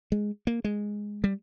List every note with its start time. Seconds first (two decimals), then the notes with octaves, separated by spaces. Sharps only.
0.12 G#3
0.47 A#3
0.64 G#3
1.24 G3